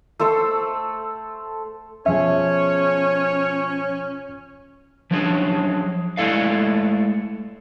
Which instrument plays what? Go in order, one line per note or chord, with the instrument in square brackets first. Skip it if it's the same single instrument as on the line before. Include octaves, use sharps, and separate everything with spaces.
[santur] A3 A4 C5 E6
[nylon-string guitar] B2 F3 G#4 [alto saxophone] C#4 [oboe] C#5 [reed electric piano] E5
[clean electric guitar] F3 F#3 C#4 D4 G#4
G#3 A3 E4 A4 D5 F5